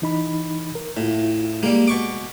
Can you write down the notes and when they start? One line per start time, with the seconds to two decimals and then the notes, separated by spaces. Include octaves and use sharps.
0.02 E3 D#4 B5
0.75 A#4
0.97 A2 E4 F4
1.63 G3 G#3 A#3
1.88 B2 C#6 D6